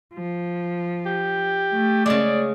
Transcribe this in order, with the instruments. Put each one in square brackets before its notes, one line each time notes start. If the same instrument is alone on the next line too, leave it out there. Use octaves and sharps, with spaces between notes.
[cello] F3
[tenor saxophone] G4
[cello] A3
[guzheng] C#3 G#3 [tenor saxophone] D5